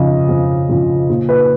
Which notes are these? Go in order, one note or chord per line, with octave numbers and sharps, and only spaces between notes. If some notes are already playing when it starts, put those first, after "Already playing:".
Already playing: F2 C#3 F3 D#5
F2
C#3 F3
A#2
B4